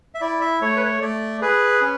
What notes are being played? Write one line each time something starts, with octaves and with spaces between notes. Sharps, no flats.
E5
E4 D5
E5
A3 C#5
B4
C#5
A3 D5
G#4 B4
C#4